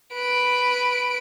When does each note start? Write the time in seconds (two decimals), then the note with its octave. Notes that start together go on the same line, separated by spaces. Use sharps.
0.14 B4 D7